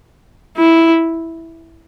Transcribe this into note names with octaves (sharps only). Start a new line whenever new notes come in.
E4